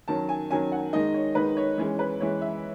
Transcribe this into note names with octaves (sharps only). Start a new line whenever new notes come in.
D#3 F#3 C#4 A5
G#5
D#3 F#3 C#4 G#5
F#5
D#3 G#3 D#4 D#5
C#5
D#3 G#3 D#4 B4
C#5
E3 G#3 C#4
B4
E3 G#3 C#4 C#5
E5